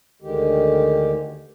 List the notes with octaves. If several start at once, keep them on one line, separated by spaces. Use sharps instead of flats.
D2 D3 D#3 G#3 G4